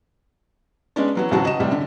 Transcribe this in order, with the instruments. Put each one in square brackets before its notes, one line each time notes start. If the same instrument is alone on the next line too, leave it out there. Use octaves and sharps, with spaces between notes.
[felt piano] G#3 B3 C#4 D4
E3 F#3 B3
G#1 C#2 E3 F#3 F#4 A5
D#5 E7
A2 C3 G3
D3